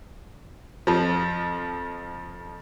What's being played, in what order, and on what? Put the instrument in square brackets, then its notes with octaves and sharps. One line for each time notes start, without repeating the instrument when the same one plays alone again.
[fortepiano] F2 F3